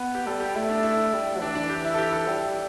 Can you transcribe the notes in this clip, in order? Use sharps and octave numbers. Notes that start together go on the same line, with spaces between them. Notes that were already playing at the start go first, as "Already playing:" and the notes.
Already playing: B3 B4
G4
G3 A4
G4
A3 E4
D4
E4
G3
E3 D4
D4
G4
E4
A4
G4
A4
G3